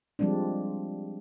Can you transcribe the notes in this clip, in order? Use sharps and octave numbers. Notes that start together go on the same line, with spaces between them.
F3 G3 G#3 C4 D4